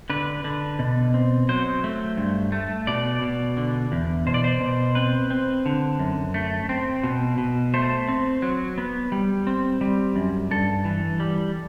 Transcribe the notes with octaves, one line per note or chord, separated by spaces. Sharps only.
D3 B4
D3
B2
C4
F#3 C5
A3
G2
A3
B2 D5
B2
D3
E2
B2 C5
D5
C5
B2
C4 B4
C4
D3
F#2
A3
C4
B2
B2
A3 C5
C4
F#3
B3
G3
C4
G3
F#2
G2 A4
E3
G3